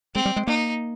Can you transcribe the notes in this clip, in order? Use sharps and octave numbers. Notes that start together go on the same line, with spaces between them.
G#3 C4
G3
G#3
A#3 D#4